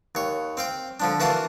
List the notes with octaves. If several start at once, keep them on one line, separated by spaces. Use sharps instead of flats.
D#2 C#5
C4 F5 G5
D3 F3 D4
E3 A#3 F4 F#4 A#4 A5